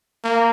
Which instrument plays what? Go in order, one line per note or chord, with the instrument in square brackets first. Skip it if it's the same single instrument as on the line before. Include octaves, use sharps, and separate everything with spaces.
[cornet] A#3